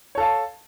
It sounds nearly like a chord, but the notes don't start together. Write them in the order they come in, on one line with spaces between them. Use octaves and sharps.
C#5 A4 F5 A5